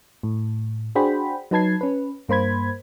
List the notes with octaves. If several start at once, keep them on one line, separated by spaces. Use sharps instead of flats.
A2
D4 F#4 G#4 C5 G5 B5
F#3 D#4 B4 A5 G#6 C7
C#4 B4
G2 A#3 C5 B5 G#6